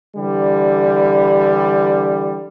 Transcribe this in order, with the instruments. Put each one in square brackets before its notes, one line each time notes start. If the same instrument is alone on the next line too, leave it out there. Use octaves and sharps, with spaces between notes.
[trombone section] D3 E3 G3